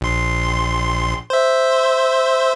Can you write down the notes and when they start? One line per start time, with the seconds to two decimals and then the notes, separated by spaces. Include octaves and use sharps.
0.01 A#1 C6
1.30 C5 E5